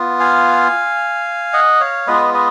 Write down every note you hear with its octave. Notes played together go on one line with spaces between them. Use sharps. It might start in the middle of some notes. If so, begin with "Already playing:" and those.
Already playing: B3 F4
F5 G#5
D#5 F#5
C#5 F5
G#3 B3 F4 B4 D#5
B4 D#5